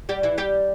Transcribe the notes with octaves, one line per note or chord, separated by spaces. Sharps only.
G3 G4
E3 E4
G3 G4